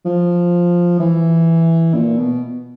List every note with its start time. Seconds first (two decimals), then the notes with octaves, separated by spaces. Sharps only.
0.06 F3
0.99 E3
1.94 A#2
2.18 B2